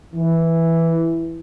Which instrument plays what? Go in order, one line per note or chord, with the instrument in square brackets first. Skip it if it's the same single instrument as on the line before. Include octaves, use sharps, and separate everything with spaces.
[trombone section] E3